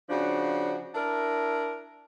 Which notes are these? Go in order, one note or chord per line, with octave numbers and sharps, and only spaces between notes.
C#3 F3 D4 F#4
D4 E4 A#4